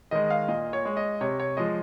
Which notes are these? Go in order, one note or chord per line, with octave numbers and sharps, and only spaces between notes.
D#3 G#3 D#5
F5
A#2 D#5
C#5
G#3
D#5
C3 C#5
C#5
F3 G#3 D#5